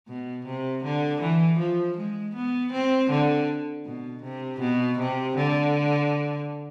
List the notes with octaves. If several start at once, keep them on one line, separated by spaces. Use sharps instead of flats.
B2
C3
D3
E3
F3
G#3
B3
C4
D3
B2
C3
B2
C3
D3